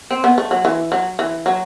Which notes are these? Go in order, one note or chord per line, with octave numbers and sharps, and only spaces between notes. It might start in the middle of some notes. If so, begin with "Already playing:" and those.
C4
B3
A3
F#3
E3
F#3
E3
F#3